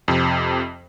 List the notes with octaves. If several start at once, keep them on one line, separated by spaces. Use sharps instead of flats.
F2 C3